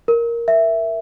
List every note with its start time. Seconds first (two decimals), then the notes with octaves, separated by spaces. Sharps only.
0.08 A#4
0.48 E5